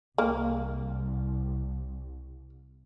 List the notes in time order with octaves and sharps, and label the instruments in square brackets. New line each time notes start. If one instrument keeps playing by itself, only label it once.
[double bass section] C2 [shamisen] A#3